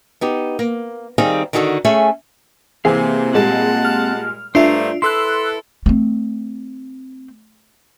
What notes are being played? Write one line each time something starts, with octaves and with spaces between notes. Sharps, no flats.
B3 D#4 G4
A#3
D#3 G3 C4 D#4 G#4 F5
D3 D#3 D#4 F#4 G#4 A4
A3 C#4 G#4 E5 G#5
C3 E3 A#3 C4 G#4 F5
A#2 G3 G#3 F#5 A5
F6
G2 A3 D4 F4 C5 E5 A#5 C7
E4 A4 B4 C6 E6 F#6
A3 C4